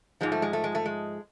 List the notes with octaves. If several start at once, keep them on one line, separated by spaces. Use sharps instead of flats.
G#2 F3 G#3
A3
G#3
A3
G#3
A3
G#3